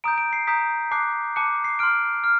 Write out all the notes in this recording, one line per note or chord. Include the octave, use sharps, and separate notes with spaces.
A#5 D#6 G6 D7
D7
C7
A#5 D#6 G6 B6
A5 D6 F#6 C7
A5 D6 F#6 C#7
C7
C6 F6 D7
F6